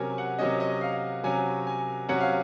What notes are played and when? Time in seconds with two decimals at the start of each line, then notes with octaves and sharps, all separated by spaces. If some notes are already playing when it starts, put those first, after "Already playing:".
Already playing: C3 F#3 C#4 A#4 G#5
0.18 F#5
0.39 C3 F#3 C#4 D#5
0.60 D#5
0.81 F5
1.24 C3 F#3 C#4 G#5
1.67 G#5
2.09 C3 F#3 C#4 F#5
2.21 F5